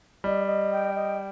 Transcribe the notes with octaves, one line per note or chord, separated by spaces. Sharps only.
G3 D#5
D#5
G5
D#5